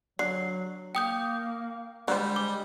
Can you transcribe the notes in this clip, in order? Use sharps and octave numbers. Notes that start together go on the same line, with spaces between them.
D3 F#3 C7
A#3 G5 D#6 G6
D3 G3 G#3 C5
D6